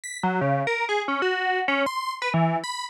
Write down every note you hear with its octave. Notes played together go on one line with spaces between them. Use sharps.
B6
F#3
C#3
A#4
G#4
C#4
F#4
C#4
C6
B4
E3
B5